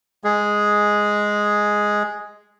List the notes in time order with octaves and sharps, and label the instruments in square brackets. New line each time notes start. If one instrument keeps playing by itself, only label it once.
[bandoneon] G#3 G#4